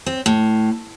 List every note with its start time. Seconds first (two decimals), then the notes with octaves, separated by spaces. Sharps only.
0.06 C4
0.26 A2